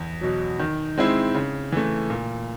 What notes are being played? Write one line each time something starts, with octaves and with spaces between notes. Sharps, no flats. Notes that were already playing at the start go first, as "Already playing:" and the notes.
Already playing: E2
B2 F#3
D#3
G#3 C4 E4
C#3
E3 A3
A#2